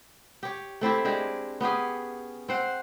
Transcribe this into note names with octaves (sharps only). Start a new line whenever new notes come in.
G4 C#5
A3 C4 E4 G4
G#3 D4 G4
B3 C#4 G4 G#4
C4 C5 F#5